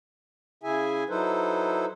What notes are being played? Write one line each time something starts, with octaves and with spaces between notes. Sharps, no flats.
C#3 E4 G#4 E5 G#5
F#3 D#4 E4 A4 B4 C5